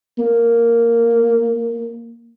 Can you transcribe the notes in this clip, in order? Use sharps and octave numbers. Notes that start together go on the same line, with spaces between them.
A#3